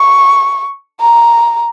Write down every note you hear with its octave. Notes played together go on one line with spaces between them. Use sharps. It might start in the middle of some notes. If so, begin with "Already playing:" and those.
Already playing: C#6
A#5